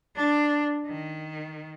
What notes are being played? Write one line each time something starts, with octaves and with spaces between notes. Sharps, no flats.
D4
D#3